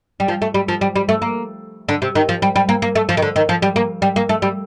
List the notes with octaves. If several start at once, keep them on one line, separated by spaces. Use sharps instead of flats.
G3
F3
A3
G3
F3
G3
G3
A3
A#3
D3
C3
D#3
F3
G3
G3
A#3
A#3
A3
F3
D#3
D3
D#3
F3
G3
A#3
G3
A#3
A3
G3